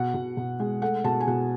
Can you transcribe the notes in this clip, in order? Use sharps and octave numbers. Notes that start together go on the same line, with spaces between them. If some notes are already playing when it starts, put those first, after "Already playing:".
Already playing: B2 F#5
B2
B2
G#3
A3 F#5
B2 A5
G#5
B2 F#5